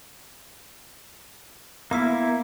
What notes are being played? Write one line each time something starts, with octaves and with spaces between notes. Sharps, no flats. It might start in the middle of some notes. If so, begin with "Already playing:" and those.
A#3 B3 E4 E6